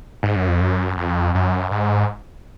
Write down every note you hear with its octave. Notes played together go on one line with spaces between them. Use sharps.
G#2
F#2
F2
F#2
F2
F#2
G#2